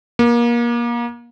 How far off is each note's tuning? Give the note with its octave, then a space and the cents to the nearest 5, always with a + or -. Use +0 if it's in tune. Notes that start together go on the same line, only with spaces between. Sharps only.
A#3 +30